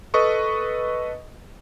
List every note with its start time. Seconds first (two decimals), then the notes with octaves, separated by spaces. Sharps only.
0.14 A4 B4 D#5 C#6 D#6